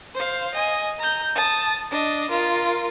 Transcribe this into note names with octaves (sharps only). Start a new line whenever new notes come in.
C5 F5
D#5 G#5
A#5 G6
A5 D#6
D4 D#5
F4 A#4